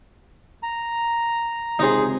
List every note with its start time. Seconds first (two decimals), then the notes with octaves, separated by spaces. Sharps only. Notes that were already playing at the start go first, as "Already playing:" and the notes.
0.63 A#5
1.79 C#2 C3 D#4 G#4 C5